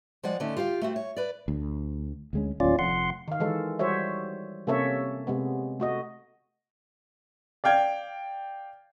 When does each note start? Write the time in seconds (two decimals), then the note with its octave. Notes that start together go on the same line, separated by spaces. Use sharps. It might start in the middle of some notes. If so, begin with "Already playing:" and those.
0.23 F3 G#3 D5 F#5
0.40 D3 D#3 A3 C#4
0.57 F4 G4 C5 F5
0.81 A3 C4 F#4
0.96 C#5
1.17 B4 D5
1.48 D2
2.33 D2 G#3 C#4
2.60 D1 D#2 C#4 F4 D5
2.79 F1 F2 F#5 C6
3.28 D#3 F5
3.40 D#3 E3 G#3 A4
3.79 G3 F#4 C5 C#5 E5
4.67 C3 A#3 C#4 A4 C#5 E5
5.27 C3 G#3 B3
5.80 A3 F#4 D#5
7.64 D5 F5 G5 G#6